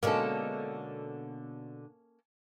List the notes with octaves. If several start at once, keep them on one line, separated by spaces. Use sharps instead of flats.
B2 D3 G#3 A#3 C#4 A4